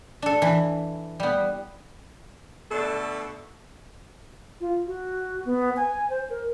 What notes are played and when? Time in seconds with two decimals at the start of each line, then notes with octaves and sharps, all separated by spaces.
0.22 D4 A4
0.42 E3
1.20 G3 B3
2.71 B2 D3 A3 A4
4.61 F4
4.87 F#4
5.45 B3
5.76 G#5
6.10 C5
6.30 A#4